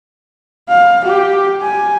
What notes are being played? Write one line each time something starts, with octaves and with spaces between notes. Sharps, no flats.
F5
G4
G#5